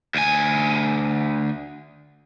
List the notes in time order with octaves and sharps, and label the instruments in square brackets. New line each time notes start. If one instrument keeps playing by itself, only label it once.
[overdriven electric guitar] D2 G#5